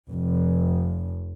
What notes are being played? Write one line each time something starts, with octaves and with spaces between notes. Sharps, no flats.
F1